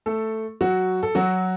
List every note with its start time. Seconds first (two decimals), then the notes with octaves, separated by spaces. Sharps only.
0.06 A3 A4
0.61 F#3 F#4
1.03 A4
1.15 F#3 F#4